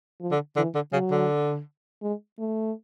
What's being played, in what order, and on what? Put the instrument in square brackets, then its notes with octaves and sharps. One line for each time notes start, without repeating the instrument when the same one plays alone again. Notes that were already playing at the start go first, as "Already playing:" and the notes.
[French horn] F3
[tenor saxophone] D3
[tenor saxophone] D3 [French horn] E3
[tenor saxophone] D3
[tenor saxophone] C#3 [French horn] F#3
[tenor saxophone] D3
[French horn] G#3
A3